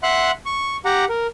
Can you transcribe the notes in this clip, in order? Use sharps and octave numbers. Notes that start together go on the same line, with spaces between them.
E5 F#5 C6 F#6
C#6
G4 F#5 A#5
A#4